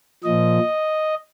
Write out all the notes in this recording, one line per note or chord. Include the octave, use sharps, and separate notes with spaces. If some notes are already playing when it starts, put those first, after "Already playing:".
A#2 F3 D#5